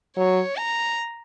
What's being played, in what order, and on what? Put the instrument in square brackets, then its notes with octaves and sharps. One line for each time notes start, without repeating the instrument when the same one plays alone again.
[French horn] F#3 [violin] C#5
[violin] A#5